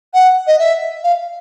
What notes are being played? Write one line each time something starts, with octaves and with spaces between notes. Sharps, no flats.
F#5
D#5
E5
F5